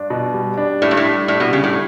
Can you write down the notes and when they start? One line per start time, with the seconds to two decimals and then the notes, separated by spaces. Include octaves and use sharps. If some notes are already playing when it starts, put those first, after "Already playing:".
Already playing: G2 D4
0.10 B2
0.34 G3
0.57 D4
0.82 A2 D4
0.91 G2
0.97 A2
1.05 G3
1.28 A2 D4
1.40 B2
1.52 C#3 G3
1.64 A2